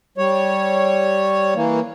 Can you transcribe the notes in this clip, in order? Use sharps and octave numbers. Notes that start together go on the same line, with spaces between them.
G3 C#5
E3 A#3